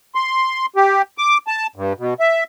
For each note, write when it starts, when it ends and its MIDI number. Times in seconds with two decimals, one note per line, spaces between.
0.15 0.66 84
0.76 1.02 67
1.18 1.38 86
1.47 1.67 81
1.76 1.93 43
1.98 2.14 47
2.20 2.44 76